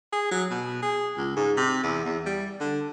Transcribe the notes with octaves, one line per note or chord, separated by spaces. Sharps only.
G#4
F#3
B2
G#4
C#2
G#2
C3
E2
E2
G3
D3